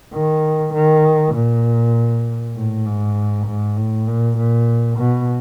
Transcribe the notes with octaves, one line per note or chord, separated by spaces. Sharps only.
D#3
D#3
A#2
A2
G#2
G#2
A2
A#2
A#2
B2